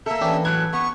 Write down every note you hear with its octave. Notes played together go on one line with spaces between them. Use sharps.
A#3 A4 E5
E3 C#4 D4 G4
A2 F#3 F#6 G#6
B3 C#6